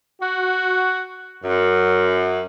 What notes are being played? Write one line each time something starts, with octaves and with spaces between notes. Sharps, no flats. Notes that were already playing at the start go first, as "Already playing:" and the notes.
F#4
F#2